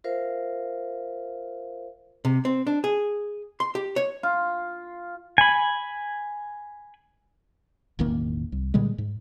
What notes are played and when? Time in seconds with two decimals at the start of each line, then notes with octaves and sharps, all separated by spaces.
0.04 F4 A#4 C5 E5 F5
2.25 C3
2.45 C4
2.67 D4
2.84 G#4
3.60 C6
3.75 G4
3.96 C#5
4.23 F4
5.38 G#5 B5
7.99 E1 A1 D#3 A#3
8.52 C2
8.74 A#2 D3 G3 G#3
8.98 G#2